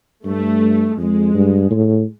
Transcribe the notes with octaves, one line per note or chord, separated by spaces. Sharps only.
G2 A3
F2 G#3
G2
A2